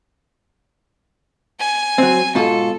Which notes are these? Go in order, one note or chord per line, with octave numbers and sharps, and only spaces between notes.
G#5
F#3 C4
G#2 B2 F4 A4